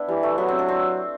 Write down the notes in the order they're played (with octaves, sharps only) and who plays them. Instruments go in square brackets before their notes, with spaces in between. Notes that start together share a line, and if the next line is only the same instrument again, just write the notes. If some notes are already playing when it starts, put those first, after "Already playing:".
Already playing: [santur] B3 D4 E4
[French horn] E3 [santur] G3
[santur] A3
[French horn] F#3 [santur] B3
[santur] C4
D4
C4